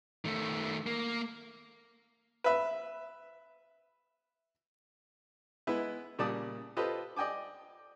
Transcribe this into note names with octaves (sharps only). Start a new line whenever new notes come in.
D#3 A3
A#3
B4 E5
G#3 B3 E4 B4
A#2 C#3 G3 D5 A5 D#6
F4 G4 A4 B4 C5 D#5
D5 D#5 G5 G#5 D6